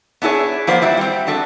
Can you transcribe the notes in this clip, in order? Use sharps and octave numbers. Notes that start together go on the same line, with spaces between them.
B3 D4 E4 G#4 C#5
F3 A#3 B3 C5 D5
G3 E4 F#4
G3 C4
B3 D4 F#4 A4